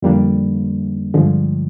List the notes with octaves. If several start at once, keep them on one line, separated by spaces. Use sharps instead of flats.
F2 D3 G3 A#3 D4
G2 D3 F3 G#3